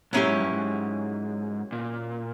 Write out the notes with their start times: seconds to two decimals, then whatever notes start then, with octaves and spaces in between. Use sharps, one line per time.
0.13 A2 F#3 A#3 C#4 E4 G4
0.26 G#2
0.40 G2
0.53 G#2
1.72 A#2